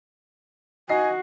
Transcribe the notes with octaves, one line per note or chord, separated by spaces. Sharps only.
D#4 F#4 D#5 G#5 C7